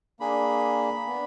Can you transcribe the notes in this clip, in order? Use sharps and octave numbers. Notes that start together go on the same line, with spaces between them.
A#3 D4 G#4 B5
B3 D4